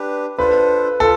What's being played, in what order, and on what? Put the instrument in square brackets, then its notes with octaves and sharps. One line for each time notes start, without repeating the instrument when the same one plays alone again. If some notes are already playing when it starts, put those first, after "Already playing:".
Already playing: [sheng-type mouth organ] D4 G4 B4
[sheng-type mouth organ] D4 F4 A4 C5 [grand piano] B4
[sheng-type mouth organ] F4 [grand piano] A4